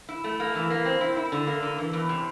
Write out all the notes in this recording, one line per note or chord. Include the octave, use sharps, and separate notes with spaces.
E4
A3
A#3
E3
A#3
C4
E4
E4
D3
A#3
D3
E3
E2
C3